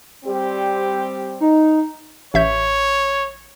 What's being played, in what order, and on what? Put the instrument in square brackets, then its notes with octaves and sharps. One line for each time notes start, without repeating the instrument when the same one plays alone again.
[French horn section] G3 C4 G4
[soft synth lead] D#4
[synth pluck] A1 E5 G6 [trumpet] C#5